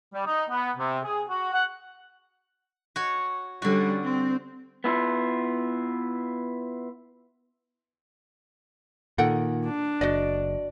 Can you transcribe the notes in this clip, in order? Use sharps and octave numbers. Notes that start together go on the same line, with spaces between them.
G3
D#4
B3
C3
G#4
F#4
F#5
F#4 C#5
D3 G3 C#4 F#4
C4
B3 E4 F4
A#2 D#3 A4 F#5 G5
D4
F#1 F#4 D5 D#5